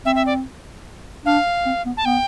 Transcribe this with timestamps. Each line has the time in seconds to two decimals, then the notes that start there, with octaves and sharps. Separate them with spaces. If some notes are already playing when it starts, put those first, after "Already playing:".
0.05 C4 E5
0.15 E5
0.26 D5
1.26 D4 F5
1.66 C4
1.86 B3
1.97 A5
2.05 B3 G5